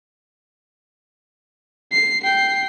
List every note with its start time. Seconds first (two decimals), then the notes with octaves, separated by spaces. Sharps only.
1.92 C7
2.23 G5 C7